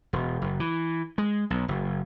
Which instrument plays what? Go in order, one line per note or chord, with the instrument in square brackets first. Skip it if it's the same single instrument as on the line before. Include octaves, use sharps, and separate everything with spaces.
[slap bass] E1
F#1
E3
G#3
B1
F#1